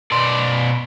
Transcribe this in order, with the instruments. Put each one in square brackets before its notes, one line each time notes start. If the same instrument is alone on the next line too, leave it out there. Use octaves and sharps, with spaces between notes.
[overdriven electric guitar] B2 D5 [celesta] C6